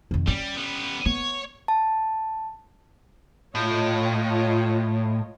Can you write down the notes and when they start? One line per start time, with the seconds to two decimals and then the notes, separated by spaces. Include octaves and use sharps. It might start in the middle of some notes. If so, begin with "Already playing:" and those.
0.11 F2 D#3
0.28 G3 C#4
0.56 G3 B3
1.06 B3 C#5
1.68 A5
3.55 A2 F4 C#5 D#5